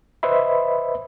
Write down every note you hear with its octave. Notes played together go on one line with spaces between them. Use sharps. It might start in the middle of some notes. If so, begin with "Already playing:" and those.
B4 C5 D#5 E5 B5